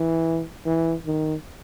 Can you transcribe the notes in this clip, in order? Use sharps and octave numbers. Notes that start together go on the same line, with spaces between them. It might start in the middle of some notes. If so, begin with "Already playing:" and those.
Already playing: E3
E3
D#3